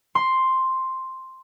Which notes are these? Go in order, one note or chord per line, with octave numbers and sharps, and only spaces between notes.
C6